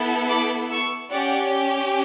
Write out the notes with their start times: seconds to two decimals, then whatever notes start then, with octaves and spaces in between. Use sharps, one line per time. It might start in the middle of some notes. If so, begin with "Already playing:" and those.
Already playing: B3 E4 A4
0.29 B5 D6
0.70 C#6 E6
1.10 C#4 G4 D5 F#5